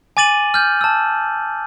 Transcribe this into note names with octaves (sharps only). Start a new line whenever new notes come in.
G#5 D6 A6 D#7 F#7
F6 G6
A5 E6